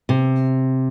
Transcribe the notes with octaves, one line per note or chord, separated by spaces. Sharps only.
C3